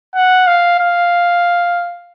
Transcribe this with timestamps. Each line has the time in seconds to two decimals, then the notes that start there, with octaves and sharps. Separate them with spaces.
0.15 F#5
0.47 F5
0.79 F5